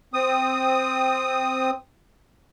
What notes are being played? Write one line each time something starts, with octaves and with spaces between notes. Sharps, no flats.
C4 D#6